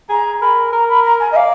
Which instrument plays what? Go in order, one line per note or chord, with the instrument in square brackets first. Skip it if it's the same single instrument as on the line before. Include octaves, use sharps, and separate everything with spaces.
[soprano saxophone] G#4 [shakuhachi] A#5
[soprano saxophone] A#4 [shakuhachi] B5
[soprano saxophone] A#4 [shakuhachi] A#5
[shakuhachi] B5
A#5
G#5
D#5
[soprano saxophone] D5 [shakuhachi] F5